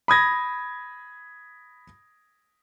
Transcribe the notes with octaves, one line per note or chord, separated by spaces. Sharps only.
B5 D#6 G#6 A#6